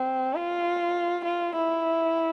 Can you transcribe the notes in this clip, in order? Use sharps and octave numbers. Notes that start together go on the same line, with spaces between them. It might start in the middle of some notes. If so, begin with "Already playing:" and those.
Already playing: C4
F4
F4
E4